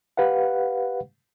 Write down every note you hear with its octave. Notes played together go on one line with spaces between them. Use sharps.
G4 B4 F5 F#5